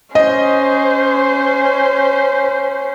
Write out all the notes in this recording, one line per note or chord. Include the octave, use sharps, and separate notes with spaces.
C#4 C5 D#5